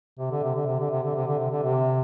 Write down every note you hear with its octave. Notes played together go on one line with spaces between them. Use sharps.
C3
D3
C3
D3
C3
D3
C3
D3
C3
D3
C3
D3
C3